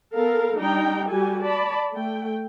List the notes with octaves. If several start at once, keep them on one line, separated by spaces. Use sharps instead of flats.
B3 A4 A#4 F5
G3 D4 D#4 G5 A#5
G3 F#4 G4 A4 G#5
D5 A5 B5
A3 G5